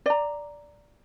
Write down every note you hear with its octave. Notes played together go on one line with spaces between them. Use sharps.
D5 A#5